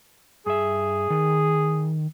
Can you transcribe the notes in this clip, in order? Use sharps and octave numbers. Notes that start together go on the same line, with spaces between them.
G2 G#4 E5
D#3